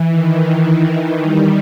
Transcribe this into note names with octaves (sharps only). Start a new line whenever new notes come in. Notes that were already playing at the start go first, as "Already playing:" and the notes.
Already playing: E3
D#3
E3
D#3 G3